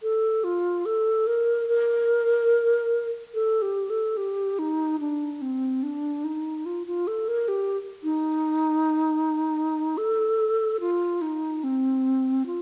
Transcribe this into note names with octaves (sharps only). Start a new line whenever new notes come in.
A4
F4
A4
A#4
A#4
A4
G4
A4
G4
D#4
D4
C4
D4
D#4
F4
F4
A4
A#4
G4
D#4
A4
F4
D#4
C4
F4